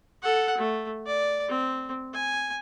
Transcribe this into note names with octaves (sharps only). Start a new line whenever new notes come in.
A4 F#5
A3
D5
C4
G#5